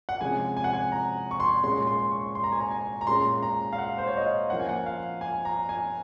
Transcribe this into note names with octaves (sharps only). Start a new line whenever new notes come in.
F#5
C3 F3 G#3 C#4 G#5
G#5
F#5
G#5
A#5
C#6
C6
A#2 G#3 C#4 C6
C6
C#6
C6
A#5
G#5
A#5
G#5
A#5
A#2 G#3 C#4 C6
A#5
F5
F#5
C5
C#5
D#5
F5
F3 A#3 C#4 F#5
G#5
F#5
F5
G#5
A#5
G#5